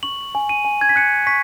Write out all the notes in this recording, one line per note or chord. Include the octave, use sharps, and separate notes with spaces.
C#6 F#7
G#5
D#7
G#5
G#6
B6
F#6 C#7
C#6 B6